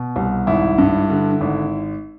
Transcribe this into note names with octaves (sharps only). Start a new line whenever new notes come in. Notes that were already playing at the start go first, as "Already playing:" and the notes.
Already playing: B2
C2
G#1 E4
G2
D3
G#1